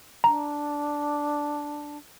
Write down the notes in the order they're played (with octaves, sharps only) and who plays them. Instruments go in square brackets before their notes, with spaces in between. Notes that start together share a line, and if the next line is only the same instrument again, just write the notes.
[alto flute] D4 [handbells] A#5